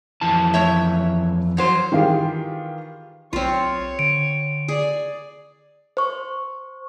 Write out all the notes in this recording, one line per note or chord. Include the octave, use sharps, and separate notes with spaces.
F2 E3 A5
A3 C#5 E5
F2 F#3 C5
D#3 E3 F4 G4 G#4
B1 C4 F4 C#5 C#6
D3 D7
G#4 D5
C5 C#6